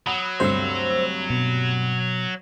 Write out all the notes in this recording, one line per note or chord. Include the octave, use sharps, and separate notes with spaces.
F#3 F#5 B5 D#6
D2 G2 C3 C5 C6 E6
B2